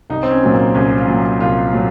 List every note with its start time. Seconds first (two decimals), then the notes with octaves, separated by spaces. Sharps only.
0.10 C2 D#4
0.23 C4
0.31 C#4
0.43 A#2 F#3
0.53 A#3
0.75 C2 C#4
0.98 F4
1.08 A#2 F#3
1.40 C2 F4
1.73 A#2 F#3